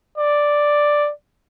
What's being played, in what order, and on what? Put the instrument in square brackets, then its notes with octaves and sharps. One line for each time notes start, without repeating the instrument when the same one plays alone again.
[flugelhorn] D5